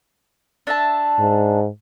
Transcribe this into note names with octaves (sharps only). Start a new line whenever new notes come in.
D4 E5 A5
G#2